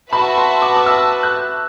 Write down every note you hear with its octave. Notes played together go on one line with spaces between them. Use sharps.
F#4 B4 E5 A5 B5
C6
D6
D6
E6
F#6